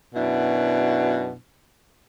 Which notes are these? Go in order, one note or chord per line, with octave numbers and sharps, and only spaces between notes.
F#2 B2 D4 E4